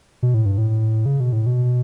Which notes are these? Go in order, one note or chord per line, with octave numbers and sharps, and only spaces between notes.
B2
A2
G2
A2
C#3
B2
A2
B2